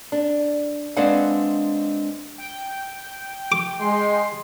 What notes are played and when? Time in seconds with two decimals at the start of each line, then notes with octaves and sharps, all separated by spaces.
0.12 D4
0.97 G#3 C4 D4 B4 F5 F#5
2.38 G5
3.52 D6
3.81 G#3 C6